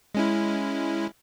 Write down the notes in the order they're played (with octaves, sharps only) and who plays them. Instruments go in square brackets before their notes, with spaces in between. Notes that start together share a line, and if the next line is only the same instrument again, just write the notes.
[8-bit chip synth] G#3 C#4 E4